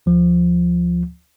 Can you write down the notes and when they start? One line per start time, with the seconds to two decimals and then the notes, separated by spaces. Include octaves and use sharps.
0.06 D2 F3